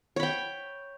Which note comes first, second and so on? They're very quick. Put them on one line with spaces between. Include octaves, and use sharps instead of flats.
C#5 B5 G5